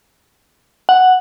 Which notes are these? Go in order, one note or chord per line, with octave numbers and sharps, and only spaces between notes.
F#5